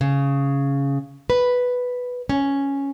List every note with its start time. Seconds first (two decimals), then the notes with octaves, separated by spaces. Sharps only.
0.01 C#3
1.30 B4
2.29 C#4